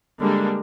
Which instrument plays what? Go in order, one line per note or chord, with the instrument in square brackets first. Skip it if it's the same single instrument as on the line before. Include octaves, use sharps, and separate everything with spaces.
[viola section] D3 G3 A#3 D4 [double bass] G#3